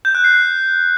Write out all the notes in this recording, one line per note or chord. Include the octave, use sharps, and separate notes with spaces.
G6
F#6
C7